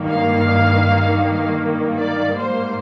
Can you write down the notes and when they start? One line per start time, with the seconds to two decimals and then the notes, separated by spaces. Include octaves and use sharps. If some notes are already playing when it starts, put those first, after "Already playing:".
Already playing: G2 D#3 A#3
0.08 F5
1.98 D5
2.37 G#2 G3 A#3 C5